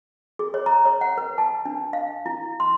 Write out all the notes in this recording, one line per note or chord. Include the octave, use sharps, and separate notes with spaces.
G#4
C#5
A#5
C#5
F#5
B4
A5
D4
F5
E4
C6